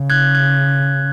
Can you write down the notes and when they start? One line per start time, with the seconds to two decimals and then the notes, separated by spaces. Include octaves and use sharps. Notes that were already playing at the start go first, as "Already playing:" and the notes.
Already playing: C#3
0.10 F#6 G#6
0.35 F#6 G#6